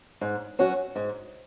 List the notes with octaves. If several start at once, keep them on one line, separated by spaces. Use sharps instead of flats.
G#2
F#3 C#4 F#4
G#2